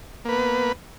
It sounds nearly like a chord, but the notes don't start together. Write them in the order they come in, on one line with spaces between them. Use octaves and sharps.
A#3 B4 B3